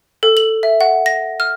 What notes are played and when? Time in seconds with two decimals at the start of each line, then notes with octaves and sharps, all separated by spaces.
0.23 A4
0.37 F#7
0.63 E5
0.81 F#5
1.06 A#6
1.40 F6